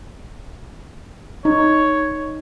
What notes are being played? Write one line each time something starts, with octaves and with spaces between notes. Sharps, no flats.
D#4 C#5